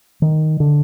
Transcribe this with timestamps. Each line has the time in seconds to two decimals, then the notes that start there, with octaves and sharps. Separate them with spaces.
0.22 D#3
0.60 D3